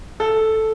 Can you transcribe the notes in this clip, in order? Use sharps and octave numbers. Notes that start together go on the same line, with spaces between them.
A4